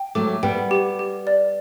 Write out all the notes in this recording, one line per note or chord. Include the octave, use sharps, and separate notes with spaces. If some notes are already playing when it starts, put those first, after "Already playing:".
Already playing: G5
F#3 A3 D6
G3 B3 G5
G4
G4
D5